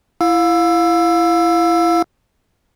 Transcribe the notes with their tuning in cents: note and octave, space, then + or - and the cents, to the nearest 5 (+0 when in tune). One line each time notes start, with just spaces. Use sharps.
E4 +20 F5 +20 E6 +10